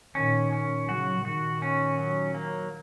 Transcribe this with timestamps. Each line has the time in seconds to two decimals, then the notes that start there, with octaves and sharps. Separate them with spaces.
0.15 A#2 D#3 C#4
0.52 C#4
0.88 C#3 F#3 F#4
1.25 A#2 D#3 F#4
1.62 C#4
1.98 F#3
2.34 A#3